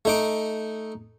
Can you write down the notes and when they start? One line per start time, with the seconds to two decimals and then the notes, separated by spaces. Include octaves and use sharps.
0.05 A3 D#4 D6